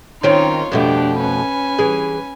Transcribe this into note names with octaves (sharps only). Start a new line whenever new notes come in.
D#3 C4 C#4 D#4 F4 C#5
F2 B2 A3 D4 G4
C#4 B4 G#5
E3 G#4